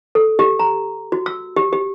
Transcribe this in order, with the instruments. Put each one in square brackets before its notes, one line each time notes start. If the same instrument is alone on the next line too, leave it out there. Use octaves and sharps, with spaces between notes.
[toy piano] A4
G4
A#5
F#4
E6
G4
G4